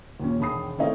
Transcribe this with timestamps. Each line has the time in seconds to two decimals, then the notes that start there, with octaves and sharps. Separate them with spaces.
0.20 D#2 A#2 C#4
0.40 E1 D#3 B5 D#6 C7
0.78 D#3 A3 C4 C#4 D#4 E4